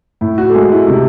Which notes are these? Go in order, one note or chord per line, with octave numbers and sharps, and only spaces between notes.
A2 E4
F#4
A4
G#3 G#4
E4
C3